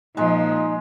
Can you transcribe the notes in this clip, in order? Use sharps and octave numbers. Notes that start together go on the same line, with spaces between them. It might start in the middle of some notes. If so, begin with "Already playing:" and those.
A#2 F3 G#3 D#4